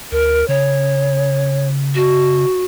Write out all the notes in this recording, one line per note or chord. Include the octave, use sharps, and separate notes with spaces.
D2 A#4
C#3 C#5
F#4